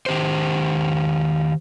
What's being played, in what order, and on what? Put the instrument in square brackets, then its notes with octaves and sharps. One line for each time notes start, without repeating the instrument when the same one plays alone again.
[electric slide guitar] D#3 G4 C5